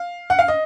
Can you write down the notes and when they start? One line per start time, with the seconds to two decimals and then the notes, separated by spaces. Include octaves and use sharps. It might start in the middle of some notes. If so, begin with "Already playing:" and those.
Already playing: F5
0.30 F#5
0.39 F5
0.48 D#5